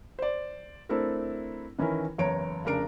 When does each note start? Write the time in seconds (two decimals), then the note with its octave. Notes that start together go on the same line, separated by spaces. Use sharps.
0.19 C5 D5
0.89 A3 C4 D4 E4 A4 A#4
1.79 D#3 E3 C#4 E4 A#4
2.18 F#1 E2 C#5 A#5 D7
2.65 F1 C#3 D4 A#4 A#5 D7